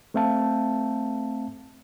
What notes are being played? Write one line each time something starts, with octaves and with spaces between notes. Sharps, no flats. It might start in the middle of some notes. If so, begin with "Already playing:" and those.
A3 C4 E5 F5 A5